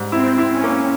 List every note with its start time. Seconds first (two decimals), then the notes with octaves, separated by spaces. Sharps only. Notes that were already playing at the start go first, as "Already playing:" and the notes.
Already playing: G#2 G3
0.12 C4 E4
0.38 E4
0.51 C#4
0.64 A#3